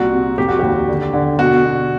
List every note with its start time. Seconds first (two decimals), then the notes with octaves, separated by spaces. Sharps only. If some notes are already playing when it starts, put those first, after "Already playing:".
Already playing: C2 A#2 F#4
0.12 C3
0.38 F1 G4
0.48 F#4
0.59 D#2 G4
0.88 D3
1.13 D3
1.39 B2 F#4
1.65 B2